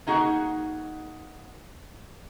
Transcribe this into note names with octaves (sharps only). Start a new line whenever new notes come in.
A#3 D#4 F#4 G#4